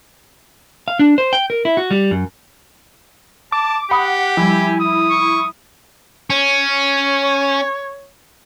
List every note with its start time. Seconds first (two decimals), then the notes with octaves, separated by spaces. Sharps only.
0.88 F5
0.99 D4
1.18 C5
1.33 G5
1.50 A#4
1.65 E4
1.77 F#4
1.91 G3
2.11 F#2
3.52 A5 D6
3.91 G4 F#5 B5 D#6
4.37 F3 G3 E4 G#5
4.80 D#6
5.10 C#6
6.30 C#4 C#5